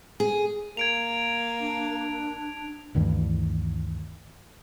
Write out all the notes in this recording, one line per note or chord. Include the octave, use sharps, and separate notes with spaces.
G#4
A#3 G#6 D7 F7
D4
D2 G2 D#3 E3